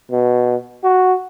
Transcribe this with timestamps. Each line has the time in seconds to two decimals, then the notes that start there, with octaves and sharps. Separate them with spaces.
0.11 B2
0.84 F#4